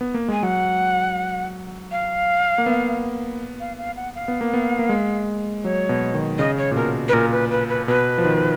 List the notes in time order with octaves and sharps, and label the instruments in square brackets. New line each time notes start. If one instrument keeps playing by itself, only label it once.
[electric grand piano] B3
A#3
[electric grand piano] G#3 [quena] G#5
[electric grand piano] F#3 [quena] F#5
[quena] F5
[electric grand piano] A#3
B3
[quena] F5
F5
F#5
F5
[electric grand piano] B3
A#3
B3
A#3
G#3
[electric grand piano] F#3 [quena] C#5
[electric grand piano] B2
D#3
[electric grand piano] C#3 [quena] D#5
[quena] C#5
[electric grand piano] A#2
[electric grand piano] B2 [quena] A#4
[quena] B4
[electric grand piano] A#2 [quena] A#4
[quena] B4
B4
B4
[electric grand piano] B2 [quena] B4
[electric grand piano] F3
D#3